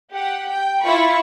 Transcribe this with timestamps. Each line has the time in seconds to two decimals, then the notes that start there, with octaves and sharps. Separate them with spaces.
0.12 G4 F#5
0.50 G5
0.82 E4 F4 B5 C#6